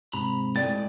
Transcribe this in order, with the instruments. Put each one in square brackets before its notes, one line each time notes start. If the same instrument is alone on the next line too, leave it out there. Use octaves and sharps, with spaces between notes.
[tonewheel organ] G#2 C3 [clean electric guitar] A#5 B5
[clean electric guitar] A2 G#3 [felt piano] D5 G5 [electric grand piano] A6